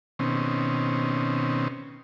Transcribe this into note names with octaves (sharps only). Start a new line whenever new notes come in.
B2 D#3 C4 C#4